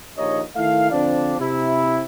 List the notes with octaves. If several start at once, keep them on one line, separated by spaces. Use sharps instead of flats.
A#1 D#2 F3 D#4 C#5 D#5
D#3 A3 E4 F5
D3 F3 C4 D4
C3 E4